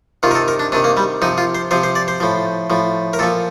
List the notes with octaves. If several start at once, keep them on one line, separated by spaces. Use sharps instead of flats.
C3 D#3 F4
A#4
A4
A#4
D4
C3 D#3 D4
A#3
G3
C3 F3 D#4
F4
C5
C3 F3 C5
C5
D5
C5
A2 F3
A2 F3
A#4
A#2 F3 A4